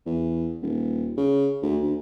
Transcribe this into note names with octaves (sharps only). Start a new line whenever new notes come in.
E2
D#1
C#3
D2
D2